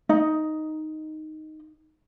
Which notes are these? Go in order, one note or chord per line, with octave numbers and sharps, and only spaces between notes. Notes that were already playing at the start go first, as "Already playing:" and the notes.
D#4 D#5